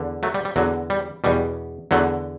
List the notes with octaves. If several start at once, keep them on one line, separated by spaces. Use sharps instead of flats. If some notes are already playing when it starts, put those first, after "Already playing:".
Already playing: E2 D3
F#3 A3
G3
G3
E2 D3 F#3
G3
E2 B2 G3
E2 D3 F#3 A3